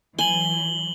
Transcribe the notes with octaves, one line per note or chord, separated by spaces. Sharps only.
E3 F#3 G#5 F#7 G7